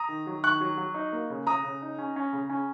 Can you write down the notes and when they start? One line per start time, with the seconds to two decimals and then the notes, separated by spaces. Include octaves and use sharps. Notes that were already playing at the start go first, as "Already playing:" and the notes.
Already playing: A#5 D#6
0.08 D#3
0.27 F#3
0.43 D#3 C#6 F#6
0.61 F#3
0.77 F#3
0.94 D#4
1.12 A#3
1.30 C#3
1.47 C#3 A#5 D#6
1.64 C#3
1.82 D#4
1.98 C#4
2.16 C#4
2.33 C#3
2.49 C#4